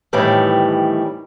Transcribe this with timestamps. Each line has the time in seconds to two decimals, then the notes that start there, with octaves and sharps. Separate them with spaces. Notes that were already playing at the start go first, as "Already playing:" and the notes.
0.13 F2 A2 D#3 E3 G3